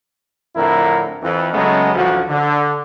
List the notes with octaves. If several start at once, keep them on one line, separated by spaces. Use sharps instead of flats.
F2 A2 D3 E4 A#4
F2 E3
C#3 F#3 G#3 A3 B3 C#4
A1 D2 F3 F#3 F#4
D3